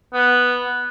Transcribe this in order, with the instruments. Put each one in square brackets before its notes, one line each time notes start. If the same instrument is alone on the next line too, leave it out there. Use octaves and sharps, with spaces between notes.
[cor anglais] B3